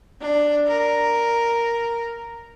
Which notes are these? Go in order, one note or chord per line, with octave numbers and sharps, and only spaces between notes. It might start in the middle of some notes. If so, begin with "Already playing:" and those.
D4
A#4